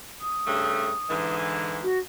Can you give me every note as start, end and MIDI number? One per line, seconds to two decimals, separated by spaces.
0.21 1.35 87
0.47 0.92 43
0.47 0.92 49
0.47 0.92 57
1.10 1.85 44
1.10 1.85 50
1.10 1.85 52
1.83 1.99 66